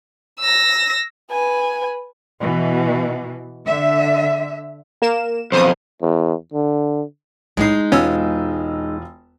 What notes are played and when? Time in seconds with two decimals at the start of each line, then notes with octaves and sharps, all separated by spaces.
0.40 E6 A#6
1.31 B4 G#5
2.42 B2 E3
3.66 D3 E5
5.02 A#3 A#4 E7
5.52 B1 F2 C5 D#6
6.02 E2
6.54 D3
7.57 B1 A2 G#3 D#4 C7
7.92 E1 B3 C#4 F4 C#5 E6